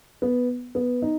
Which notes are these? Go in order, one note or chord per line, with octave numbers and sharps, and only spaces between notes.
B3
B3
D#4